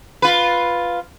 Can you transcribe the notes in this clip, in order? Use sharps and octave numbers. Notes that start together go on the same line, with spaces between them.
F4 B4